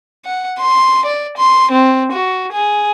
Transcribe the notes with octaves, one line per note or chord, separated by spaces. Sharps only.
F#5
C6
D5
C6
C4
F#4
G#4